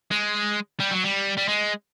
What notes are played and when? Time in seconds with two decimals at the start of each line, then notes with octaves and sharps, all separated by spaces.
0.11 G#3
0.80 G3
0.91 F#3
1.04 G3
1.37 G3
1.48 G#3